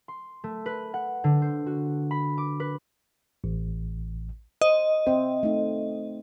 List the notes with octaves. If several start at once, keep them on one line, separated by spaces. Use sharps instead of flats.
C6
A3
B4
F#5
D3
C5
F#4
B5
D6
B4
A1
C5 D#5
C4 C5 E5
A3 D#4